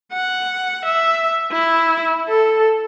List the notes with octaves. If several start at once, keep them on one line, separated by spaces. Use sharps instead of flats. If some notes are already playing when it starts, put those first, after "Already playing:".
F#5
E5
E4
A4